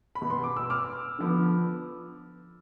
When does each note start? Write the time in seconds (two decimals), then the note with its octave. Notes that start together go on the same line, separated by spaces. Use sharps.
0.15 B5
0.22 B2 B3
0.30 C6
0.44 D6
0.57 E6
0.70 D6 F6
1.19 D3 F3 B3